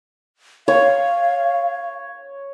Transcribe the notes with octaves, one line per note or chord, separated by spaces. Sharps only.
C#5 F5